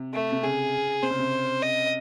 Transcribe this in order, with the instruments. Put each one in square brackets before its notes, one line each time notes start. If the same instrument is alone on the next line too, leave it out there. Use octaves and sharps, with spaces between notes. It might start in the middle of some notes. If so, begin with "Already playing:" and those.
Already playing: [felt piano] C3
[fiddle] A3
[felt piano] C3
[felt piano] C#3 [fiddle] G#4
[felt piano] C3 [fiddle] C5
[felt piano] C#3
C3
[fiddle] D#5